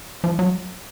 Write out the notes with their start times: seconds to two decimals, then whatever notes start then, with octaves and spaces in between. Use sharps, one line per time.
0.24 F3
0.39 F#3